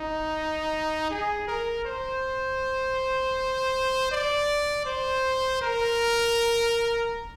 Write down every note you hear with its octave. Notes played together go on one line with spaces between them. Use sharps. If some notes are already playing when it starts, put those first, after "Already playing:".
Already playing: D#4
G#4
A#4
C5
D5
C5
A#4